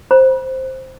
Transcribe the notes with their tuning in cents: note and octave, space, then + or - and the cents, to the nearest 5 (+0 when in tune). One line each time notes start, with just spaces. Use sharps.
C5 +5 B5 -40